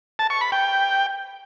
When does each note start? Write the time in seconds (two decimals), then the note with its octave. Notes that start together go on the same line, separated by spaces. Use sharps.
0.19 A5
0.30 C#6
0.41 B5
0.52 G5